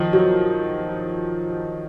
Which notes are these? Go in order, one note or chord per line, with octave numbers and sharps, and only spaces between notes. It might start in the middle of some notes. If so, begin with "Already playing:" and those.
Already playing: D#3 F3
F#3